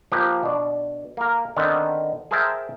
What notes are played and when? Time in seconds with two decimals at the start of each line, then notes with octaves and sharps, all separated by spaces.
0.12 F3 A#3 G4 B4
0.43 B2 D4
1.17 A#3 A#4
1.56 D3 D#3 B3 C4
2.31 G#4 A#4 C5 E5 G5 A5